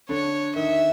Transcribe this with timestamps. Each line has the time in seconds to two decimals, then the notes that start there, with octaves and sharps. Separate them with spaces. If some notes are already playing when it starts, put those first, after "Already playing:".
0.09 D3 D4 C#5
0.56 D#3 D#4 E5